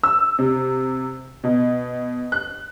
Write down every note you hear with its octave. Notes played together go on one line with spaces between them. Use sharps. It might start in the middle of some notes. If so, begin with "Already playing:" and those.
E6
C3
B2
F#6